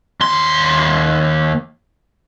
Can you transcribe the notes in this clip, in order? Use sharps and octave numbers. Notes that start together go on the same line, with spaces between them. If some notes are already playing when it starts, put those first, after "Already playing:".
D#2 C6